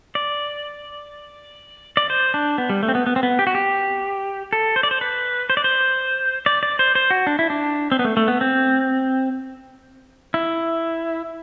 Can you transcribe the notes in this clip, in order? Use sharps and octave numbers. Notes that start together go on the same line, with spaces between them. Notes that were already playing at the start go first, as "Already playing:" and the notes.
D5
D5
C5
D4
B3
G3
A3
C4
B3
B3
C4
B3
G4
F#4
G4
A4
C5
D5
C5
B4
C5
D5
C5
D5
D5
C5
C5
F#4
D4
E4
D4
C4
B3
A3
A3
B3
C4
E4